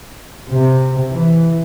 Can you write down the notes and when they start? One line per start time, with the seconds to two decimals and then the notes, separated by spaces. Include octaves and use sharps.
0.50 C3
1.12 E3